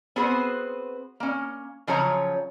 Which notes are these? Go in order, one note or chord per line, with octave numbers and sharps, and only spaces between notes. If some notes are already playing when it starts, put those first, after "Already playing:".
B3 C4 F#4 G#4 B4 C5
A#3 C#4
C#3 F3 F#3 C#5 A#5